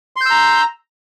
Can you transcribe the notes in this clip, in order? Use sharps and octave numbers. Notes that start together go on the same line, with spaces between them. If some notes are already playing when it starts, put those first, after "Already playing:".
A#5 C6 E6 G6